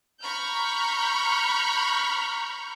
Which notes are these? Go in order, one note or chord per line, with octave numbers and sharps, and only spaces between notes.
A#5 B5 C#6 F6 G6